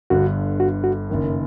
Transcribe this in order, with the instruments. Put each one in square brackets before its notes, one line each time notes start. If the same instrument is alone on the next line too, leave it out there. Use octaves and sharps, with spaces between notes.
[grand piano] G1 G2 D3 [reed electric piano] F#4
[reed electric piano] F#4
F#4
[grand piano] F#1 F#2 D#3